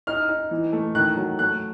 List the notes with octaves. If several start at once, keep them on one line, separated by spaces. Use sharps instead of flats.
D#4 F6
D#4
E3
A3
D#3 F#6
F#3
A3 F#6